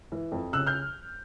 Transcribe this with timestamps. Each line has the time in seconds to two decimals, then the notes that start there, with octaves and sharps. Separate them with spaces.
0.12 E3
0.32 F2
0.53 C#3 E6 F#6
0.66 F6 G6